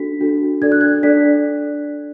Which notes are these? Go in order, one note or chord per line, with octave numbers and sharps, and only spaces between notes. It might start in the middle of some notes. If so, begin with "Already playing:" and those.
Already playing: D4 F#4 A4 B6
D4 F#4 A4
D4 A4 D5 G#6
F#6
G#6
D4 A4 D5 B6